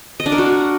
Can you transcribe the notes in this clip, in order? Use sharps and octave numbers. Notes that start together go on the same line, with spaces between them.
D#5
D4
A#4
F#4